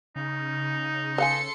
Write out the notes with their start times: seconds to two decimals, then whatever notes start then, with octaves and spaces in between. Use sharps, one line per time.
0.16 C#3 D#4
1.18 A4 B4 F5 G#5 C6 C#7